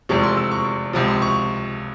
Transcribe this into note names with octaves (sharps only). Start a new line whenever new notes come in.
F1 E2 C3 F3 G#3 C#6
C6
E6
C#6
C#2 C3 F3
C6
C#6